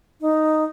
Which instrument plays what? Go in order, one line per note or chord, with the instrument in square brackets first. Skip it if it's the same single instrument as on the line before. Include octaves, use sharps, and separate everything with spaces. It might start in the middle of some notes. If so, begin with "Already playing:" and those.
[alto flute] D#4